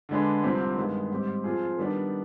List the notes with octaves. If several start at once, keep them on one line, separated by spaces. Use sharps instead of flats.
D3 G#3 D4 G#4 B4
C2 C3 F3 C4 G4
G2 D#3 G#3 B3
G#2 G3 C4 G4
F3 C4 F4 G#4
D#3 G3 B3 D4